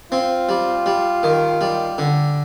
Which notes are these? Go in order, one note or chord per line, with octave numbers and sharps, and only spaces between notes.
C4 F4
G3
G3
D#3
G3
D3